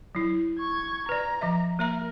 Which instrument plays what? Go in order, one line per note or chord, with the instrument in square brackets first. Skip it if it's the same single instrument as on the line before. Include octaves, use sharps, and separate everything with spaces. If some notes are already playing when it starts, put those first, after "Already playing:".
[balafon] F#3 E4
[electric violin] C#6 G#6
[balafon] B4 D5 [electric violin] A#5
[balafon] F3 D#5 E5
[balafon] A#3 E5 A#5 [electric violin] A#4